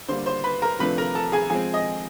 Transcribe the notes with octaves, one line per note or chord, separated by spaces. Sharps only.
D3 G3 A#3 C5 C6
C5 C6
B4 B5
A#4 A#5
C3 F3 A3 D4 B4 B5
A#4 A#5
A4 A5
G#4 G#5
F3 G#3 C4 G#4 G#5
D#5